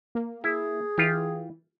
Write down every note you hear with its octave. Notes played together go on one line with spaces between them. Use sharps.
A#3
E4 G#4
E3 F4 G4